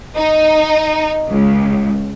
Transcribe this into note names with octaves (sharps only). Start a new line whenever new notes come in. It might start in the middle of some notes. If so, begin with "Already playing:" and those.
D#4
C#2